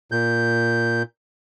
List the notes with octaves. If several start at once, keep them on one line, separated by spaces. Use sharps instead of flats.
A#2 G6